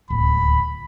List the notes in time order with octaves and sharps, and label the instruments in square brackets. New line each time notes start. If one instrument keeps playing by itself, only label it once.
[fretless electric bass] D1 [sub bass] C#2 [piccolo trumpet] B5